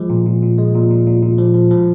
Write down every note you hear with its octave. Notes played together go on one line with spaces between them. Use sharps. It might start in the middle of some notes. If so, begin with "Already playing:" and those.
Already playing: F3 G#3
A#2
A#2
A#2
G#3
A#2
A#2
A#2
A#2
F3
F3
F3